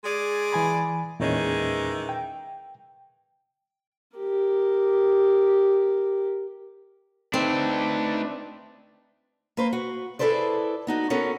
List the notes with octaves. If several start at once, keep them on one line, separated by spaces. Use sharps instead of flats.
G#3 G#4 D5
E3 G#5 B5
E2 A#2 D#3 E3 G#3 C#4
G5
G4 A#4
A3 C4 D4 D#4 B4 D5
A#3 B4 C5
F#4
E4 G#4 A4 B4 C5 D5
B3 D#4 F#4
B3 C#4 F#4 A4 A#4